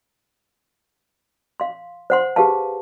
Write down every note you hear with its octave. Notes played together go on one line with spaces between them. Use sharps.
F5 C6
C5 F#5 C6
G4 G#4 B4 F5 A5